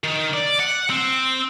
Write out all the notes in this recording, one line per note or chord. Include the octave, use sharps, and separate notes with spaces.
D#3
D5
F#5
C4